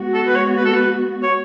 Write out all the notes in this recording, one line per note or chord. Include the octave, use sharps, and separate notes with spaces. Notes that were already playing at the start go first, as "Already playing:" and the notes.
Already playing: G#3 B3 F#4
A4
B4
C#5
B4
A4
B4
C#5